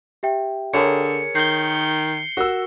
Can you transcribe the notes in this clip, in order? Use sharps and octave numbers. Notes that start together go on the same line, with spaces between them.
G4 E5 G5
D3 G#4 A#4 C#5 C#7
D#3 G6 C7 G7
F#4 A#4 E6